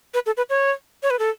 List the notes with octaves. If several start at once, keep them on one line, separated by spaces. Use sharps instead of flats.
B4
A4
B4
C#5
C#5
B4
A4